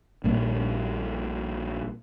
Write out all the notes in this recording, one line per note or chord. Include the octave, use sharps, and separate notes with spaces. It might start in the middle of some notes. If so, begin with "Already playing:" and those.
A#1 A#2 G3 A#3